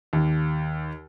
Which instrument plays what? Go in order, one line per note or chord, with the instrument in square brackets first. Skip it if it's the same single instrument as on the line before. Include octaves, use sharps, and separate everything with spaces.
[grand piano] D#2